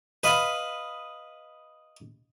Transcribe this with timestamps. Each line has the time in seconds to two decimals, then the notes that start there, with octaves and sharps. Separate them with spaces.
0.23 B4 D#5 F5 B5